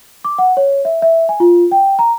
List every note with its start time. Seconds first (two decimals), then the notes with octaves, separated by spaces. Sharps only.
0.25 D6
0.38 F#5
0.57 C#5
0.85 E5
1.02 E5
1.29 G#5
1.40 F4
1.71 G5
1.99 A#5